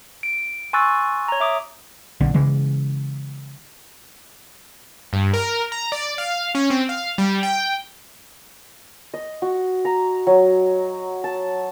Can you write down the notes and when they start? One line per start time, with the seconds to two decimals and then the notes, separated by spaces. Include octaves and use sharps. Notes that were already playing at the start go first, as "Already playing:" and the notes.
0.23 D7
0.73 G#5 C6 C#6 E6 F#6 A6
1.28 C#5 A#5
1.40 E5 D6 D#6
2.21 A#1 D3
2.34 C#3 E3 G#3
5.13 G2
5.33 A#4
5.72 A#5
5.92 D5
6.18 F5
6.55 C#4
6.70 C4
6.89 F5
7.18 G3
7.43 G5
9.14 D#5
9.42 F#4
9.85 A#5
10.27 F#3
11.24 A5